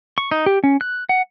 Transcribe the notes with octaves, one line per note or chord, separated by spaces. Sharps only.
C#6
D#4
G4
C#4
F#6
F#5